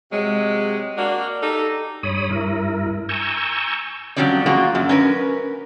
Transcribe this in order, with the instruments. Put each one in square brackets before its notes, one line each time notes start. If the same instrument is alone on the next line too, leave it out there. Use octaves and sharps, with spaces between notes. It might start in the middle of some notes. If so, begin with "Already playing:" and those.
[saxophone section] C3 F#3 G#3
A#3 D4 F#4
D#4 G4 A4
[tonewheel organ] G2 C#5 B5 D#6
G2 E4 A#4
G#5 A#5 C#6 E6 G6
[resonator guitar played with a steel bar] F2 E3 F#3 G3 C#4 D5
A#3 F4 F#4 G#4
F#2
C#4 A#4 B4